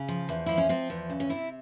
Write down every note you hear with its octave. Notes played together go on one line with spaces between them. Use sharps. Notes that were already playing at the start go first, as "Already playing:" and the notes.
Already playing: C#3
F3
E2
F3 E4
C#4
F3 C4
E2
C#3
C#4
C3 E4